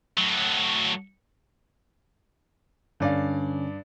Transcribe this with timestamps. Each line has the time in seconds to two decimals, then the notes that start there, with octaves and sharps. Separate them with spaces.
0.17 A2 F#3
3.00 G2 D3 C#4 D5 F5